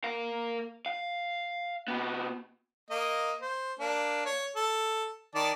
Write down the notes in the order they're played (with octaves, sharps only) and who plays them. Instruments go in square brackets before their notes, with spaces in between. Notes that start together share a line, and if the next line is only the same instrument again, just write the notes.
[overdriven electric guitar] A#4 F5
F5
C3 B3
[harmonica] A#3 D#5
C5
A#3 D4
C#5
A4
D#3 D5 A5